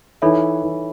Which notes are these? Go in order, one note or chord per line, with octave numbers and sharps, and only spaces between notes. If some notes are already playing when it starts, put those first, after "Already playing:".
E3 D#4 A4 C#5 E5 B5
E3